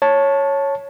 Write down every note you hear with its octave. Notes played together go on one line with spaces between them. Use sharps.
C#5 A5